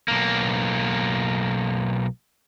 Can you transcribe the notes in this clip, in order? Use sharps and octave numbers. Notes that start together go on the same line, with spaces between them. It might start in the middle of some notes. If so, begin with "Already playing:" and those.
B1 A#3